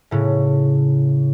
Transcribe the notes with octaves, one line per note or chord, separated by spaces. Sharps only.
A2 C#3